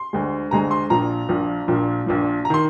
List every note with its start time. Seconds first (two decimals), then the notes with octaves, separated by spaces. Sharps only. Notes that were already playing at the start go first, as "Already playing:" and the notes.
Already playing: C6
0.13 D2 D3 G#3
0.51 D2 D3 G#3 A#5
0.71 C6
0.90 A#1 A#2 F3 A#5
1.29 A#1 A#2 F3
1.68 A#1 A#2 F3
2.06 A#1 A#2 F3
2.45 A#5
2.50 D#3 C6